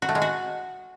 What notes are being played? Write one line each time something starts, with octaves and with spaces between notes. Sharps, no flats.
F#4
A3
G#3
F#4